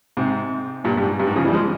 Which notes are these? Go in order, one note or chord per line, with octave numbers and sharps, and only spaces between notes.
G#2 C3
G2 A#2
G2
G#2
G2
G#2
C#3 F3
E3 G3
F3 G#3